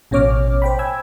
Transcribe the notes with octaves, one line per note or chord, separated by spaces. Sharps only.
A1 B2 C#4 C#5 D6 F6
C5 G5 B5
G5 G#5 E6 G#6